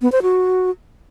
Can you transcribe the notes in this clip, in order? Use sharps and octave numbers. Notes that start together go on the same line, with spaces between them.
B3
C5
F#4